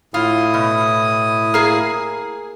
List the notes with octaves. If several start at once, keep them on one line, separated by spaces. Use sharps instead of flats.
A2 E4 F4 D#6
B2
A#3 G#4